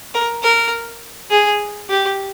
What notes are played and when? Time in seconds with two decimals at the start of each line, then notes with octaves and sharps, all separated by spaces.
0.14 A#4
0.43 A#4
1.31 G#4
1.90 G4